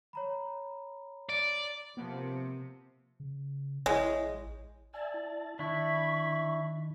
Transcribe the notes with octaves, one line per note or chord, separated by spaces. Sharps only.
C#5 A#5 B5
D5
C3 F3 A#3 B3
C#3
A1 G#3 E4 G#4 C#5
D5 E5 G#5 A5
E4 A5
D#3 D4 E4 B5 C#6